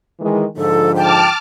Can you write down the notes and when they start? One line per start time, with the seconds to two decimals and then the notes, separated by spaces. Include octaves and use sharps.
0.20 D#3 E3 G#3
0.57 G#2 D3 F3 A4
0.96 G5 A5 D6 F6